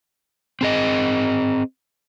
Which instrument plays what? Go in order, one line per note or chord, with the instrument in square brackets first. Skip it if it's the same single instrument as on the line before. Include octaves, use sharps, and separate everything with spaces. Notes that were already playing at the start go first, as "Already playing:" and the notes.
[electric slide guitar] C4 G#4 D#5